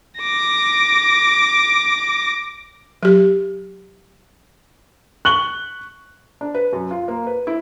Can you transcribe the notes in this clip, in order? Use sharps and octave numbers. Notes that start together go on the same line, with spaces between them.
D6 A#6
F#3 G4
C#6 F#6 F#7 G7
D4
B4
F#2
F4
A#3
B4
E4